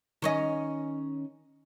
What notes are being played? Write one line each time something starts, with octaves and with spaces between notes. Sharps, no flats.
D#3 C#4 D#5